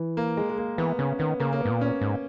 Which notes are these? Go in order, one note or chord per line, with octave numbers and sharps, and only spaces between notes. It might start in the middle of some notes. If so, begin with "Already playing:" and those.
Already playing: E3
A#3
G#3
G#3
A#3
E3 B3
C#3 C#4
D#3 B3
C#3 A#3
A#3
G#2 B3
A#2
C#4
G#2